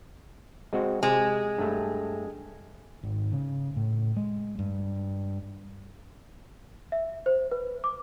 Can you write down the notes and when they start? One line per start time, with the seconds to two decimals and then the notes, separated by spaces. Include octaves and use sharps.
0.73 G#3 C4 F#4
1.03 C3 G#3
1.58 G2 A3
3.03 G#1
3.33 C#3
3.76 A2
4.17 G#3
4.59 G2
6.92 E5
7.26 C5
7.51 B4
7.84 D6